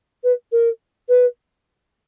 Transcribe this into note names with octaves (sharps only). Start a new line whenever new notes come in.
B4
A#4
B4